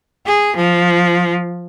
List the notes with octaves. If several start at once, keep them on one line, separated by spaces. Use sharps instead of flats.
G#4
F3